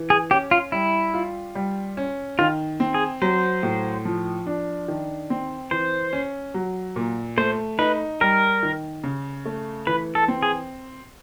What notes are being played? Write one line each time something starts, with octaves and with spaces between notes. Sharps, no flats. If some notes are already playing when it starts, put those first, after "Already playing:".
Already playing: E3
G#4
C#4 G4
F4
G3 E4
F4
G3
C#4
D#3 F4
C4
G#4
F#3 C5
A2
F3
D4
D#3
C4
E3 C5
C#4
F#3
A#2
A3 C5
D#4 B4
G3 A#4
D#3
C#3
A3
E3 B4
A4
C4
G#4